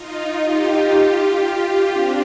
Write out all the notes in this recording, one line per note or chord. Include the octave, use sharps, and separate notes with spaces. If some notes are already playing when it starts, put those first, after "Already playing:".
Already playing: D#4 F4
F4 G4
C4 D4